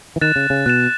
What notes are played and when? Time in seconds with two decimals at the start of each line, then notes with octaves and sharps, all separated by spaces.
0.16 E3
0.21 D#3 F#6 A6 E7
0.36 C#3
0.50 C#3
0.66 B2 F#6 A6 E7